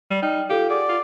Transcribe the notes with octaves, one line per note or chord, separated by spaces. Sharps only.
G3
D#4 D5 G5 F6
F4 G4 A4 F5
G#4 D5 F#5
F4